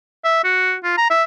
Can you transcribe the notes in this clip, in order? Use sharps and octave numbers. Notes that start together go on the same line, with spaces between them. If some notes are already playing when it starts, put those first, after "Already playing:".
E5
F#4
F4
A#5
E5